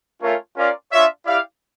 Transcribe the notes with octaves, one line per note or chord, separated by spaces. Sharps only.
A3 C#4 F4 A#4 C#5
C#4 F4 A#4 D5 F5
D4 F4 C#5 E5
E4 G4 D5 F5